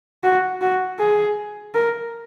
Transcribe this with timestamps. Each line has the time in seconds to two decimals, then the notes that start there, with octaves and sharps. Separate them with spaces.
0.24 F#4
0.61 F#4
0.99 G#4
1.74 A#4